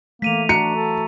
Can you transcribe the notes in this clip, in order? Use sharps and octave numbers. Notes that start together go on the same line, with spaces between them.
E3 A3 A#3 B6 D#7 F7
D4 F#4 A#5 C#7
A4